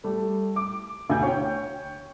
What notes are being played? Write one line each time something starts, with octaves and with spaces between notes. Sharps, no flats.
G3 A3
D6
D2 B2 G#5 G6
C#5 G5